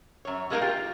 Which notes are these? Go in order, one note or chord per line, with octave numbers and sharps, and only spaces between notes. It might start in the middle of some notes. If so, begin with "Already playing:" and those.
F#2 C#5
G3 G#3 A#3 C4 D#4 A#4
F4 G4